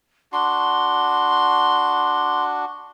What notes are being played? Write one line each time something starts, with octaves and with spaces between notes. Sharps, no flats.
D4 F#4 C6